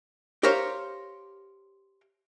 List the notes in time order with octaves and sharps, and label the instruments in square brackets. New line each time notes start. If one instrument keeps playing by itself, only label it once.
[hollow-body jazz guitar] G4 A#4 C5 C#5 F5